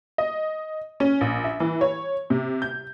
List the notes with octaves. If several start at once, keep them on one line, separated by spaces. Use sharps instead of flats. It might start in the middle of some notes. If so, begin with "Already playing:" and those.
D#5
C#4
A#1
E5
E3
C#5
C3
G6